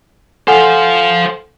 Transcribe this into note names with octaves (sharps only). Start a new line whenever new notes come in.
A4 C5 F5 F#5 G#5